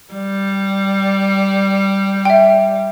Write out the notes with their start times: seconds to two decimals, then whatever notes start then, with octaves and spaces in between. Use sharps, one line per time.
0.14 G3
2.25 E5 G5